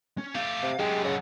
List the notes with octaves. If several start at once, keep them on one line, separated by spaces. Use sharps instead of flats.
C#4
A3 G4 F5
C3
F#2 D3 G#3 G4 G5
C#3 D#5 F#5